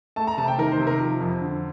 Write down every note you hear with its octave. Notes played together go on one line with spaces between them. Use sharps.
A3 A5
A#5
C3 A5
G5
D#3 A#4
C5
C3
A#4
F3
F2
D3